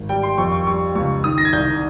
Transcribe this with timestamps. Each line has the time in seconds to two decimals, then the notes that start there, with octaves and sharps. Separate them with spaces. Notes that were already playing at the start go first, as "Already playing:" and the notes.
Already playing: G#1
0.09 G3 G5
0.23 C6
0.38 F2 C#6
0.52 C#6
0.67 G3 C#6
0.95 C#2 C#6
1.24 D#3 D#6
1.38 A#6
1.45 G#6
1.53 C2 G6